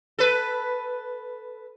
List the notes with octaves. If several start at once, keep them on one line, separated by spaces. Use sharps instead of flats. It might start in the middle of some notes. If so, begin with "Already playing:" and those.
A4 B4